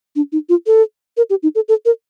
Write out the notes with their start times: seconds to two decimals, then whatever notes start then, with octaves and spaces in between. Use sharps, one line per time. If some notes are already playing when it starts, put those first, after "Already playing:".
0.16 D4
0.32 D#4
0.49 F4
0.67 A4
1.17 A#4
1.30 G4
1.43 D#4
1.55 A4
1.69 A4
1.85 A#4